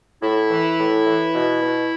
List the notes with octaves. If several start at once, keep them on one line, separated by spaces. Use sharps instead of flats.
A2 E4
E3
A2
E3
B2
B2